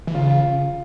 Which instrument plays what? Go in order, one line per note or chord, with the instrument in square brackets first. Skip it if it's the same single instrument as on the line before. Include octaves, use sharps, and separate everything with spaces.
[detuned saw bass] E3
[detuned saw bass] C#3 [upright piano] F4